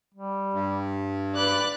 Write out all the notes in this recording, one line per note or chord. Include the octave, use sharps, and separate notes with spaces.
G3
G2
B4 D5 F#6